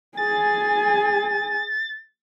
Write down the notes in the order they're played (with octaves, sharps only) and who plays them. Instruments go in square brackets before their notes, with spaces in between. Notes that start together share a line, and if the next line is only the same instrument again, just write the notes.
[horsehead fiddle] G#4 G#5 [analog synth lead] A6